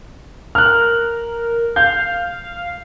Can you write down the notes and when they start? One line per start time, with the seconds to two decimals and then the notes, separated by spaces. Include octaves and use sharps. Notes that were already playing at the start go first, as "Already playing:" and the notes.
0.55 A#4 F6 F#6
1.76 F5 G6